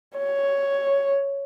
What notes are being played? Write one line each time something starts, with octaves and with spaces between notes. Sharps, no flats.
C#5